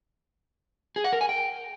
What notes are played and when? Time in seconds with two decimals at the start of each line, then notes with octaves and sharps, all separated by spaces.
0.96 G#4
1.04 F#5
1.13 A#4
1.21 G#5
1.29 G5